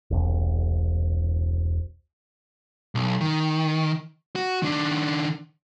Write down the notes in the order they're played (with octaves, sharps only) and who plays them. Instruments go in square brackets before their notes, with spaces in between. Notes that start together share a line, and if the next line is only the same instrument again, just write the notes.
[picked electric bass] E1 C2
[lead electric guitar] B1
D#3
F#4
D#3 D4